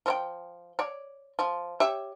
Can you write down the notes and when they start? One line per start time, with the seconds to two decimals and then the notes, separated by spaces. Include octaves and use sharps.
0.06 F3 C#5 G5
0.79 C#5 D5
1.39 F3
1.80 G4 C#5 E5